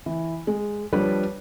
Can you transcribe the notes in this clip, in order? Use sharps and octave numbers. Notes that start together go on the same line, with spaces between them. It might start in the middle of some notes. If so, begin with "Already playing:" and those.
E3
G#3
F3 G3 D4 B4 C#5